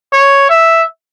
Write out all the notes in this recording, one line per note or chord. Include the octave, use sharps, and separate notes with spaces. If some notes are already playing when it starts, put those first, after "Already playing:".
C#5
E5